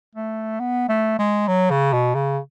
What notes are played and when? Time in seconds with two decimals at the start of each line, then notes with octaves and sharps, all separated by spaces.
0.15 A3
0.60 B3
0.89 A3
1.19 G#3
1.48 F#3
1.71 C#3
1.93 B2
2.15 C#3